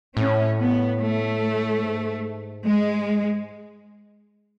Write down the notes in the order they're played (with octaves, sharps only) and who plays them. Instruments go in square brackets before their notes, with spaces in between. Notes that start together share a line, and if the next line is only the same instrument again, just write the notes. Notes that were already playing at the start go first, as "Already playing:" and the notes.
[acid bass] A2 [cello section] C#4
[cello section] B3
A3
[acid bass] G#2
[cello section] G#3